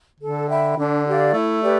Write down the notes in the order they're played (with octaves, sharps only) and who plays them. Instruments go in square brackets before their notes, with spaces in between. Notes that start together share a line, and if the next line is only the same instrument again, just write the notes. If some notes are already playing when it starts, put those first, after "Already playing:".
[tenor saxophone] D3 [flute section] A4
[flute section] E5 G5 B5
[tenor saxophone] D3 [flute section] D4
[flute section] G4 D5 F5
[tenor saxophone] A3 [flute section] E4
[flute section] G4 B4 D5